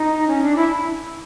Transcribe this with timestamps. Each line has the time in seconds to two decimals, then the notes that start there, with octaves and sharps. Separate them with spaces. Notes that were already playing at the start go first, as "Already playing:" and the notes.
Already playing: D#4
0.27 C#4
0.42 D4
0.56 E4